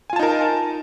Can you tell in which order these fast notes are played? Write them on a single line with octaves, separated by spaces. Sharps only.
G#5 F4 A5 D#4 A#4